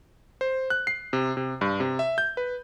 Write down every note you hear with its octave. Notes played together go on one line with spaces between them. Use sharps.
C5
F#6
C7
C3
C3
G2
C3
E5
G6
B4